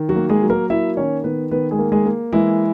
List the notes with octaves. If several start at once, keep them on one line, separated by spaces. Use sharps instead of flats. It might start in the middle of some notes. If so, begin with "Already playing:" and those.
Already playing: D#3
F#3 F#4
A#3
G#3 G#4
F#3
A#3 A#4
A#3 E4 E5
D#3 C#4 C#5
D#3 B3 B4
D#3 B3 B4
G#3 G#4
A#3
G#3 G#4
A#3
E3 G#3 E4